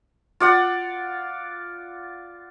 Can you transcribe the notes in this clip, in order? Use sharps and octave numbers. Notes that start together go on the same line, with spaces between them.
F4 D5 F#5